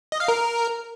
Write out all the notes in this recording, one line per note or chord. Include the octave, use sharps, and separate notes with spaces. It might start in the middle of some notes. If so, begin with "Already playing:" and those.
D#5
F5
A#4